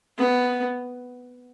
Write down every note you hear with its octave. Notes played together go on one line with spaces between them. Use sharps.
B3